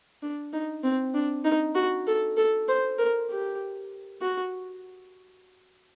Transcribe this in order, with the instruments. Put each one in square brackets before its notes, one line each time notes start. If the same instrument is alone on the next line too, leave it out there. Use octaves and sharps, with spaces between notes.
[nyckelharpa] D4
D#4
C4
D4
D#4
F#4
A4
A4
C5
A#4
G4
F#4